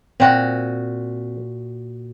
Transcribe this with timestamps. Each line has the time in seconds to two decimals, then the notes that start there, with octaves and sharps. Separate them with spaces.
0.20 A#2 C4 F#4